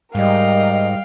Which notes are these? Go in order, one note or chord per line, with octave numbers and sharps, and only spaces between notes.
G#2 G3 A#4 D#5 F5 G5